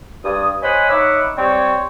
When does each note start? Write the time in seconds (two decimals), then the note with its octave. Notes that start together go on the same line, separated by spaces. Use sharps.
0.24 G2 D#6
0.63 C5 C#5 D#5 F#5 G#5 B5
0.90 D#4 C#5 E5 F#5 B5 D6
1.38 G3 C4 C#5